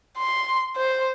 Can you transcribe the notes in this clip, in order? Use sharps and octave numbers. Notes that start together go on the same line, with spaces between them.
C6
C5